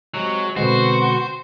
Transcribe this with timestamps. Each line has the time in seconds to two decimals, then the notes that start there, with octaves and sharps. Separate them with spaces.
0.14 C3 F#3 G#3
0.57 B2 D3 G#3 C4 F#4 B4 C5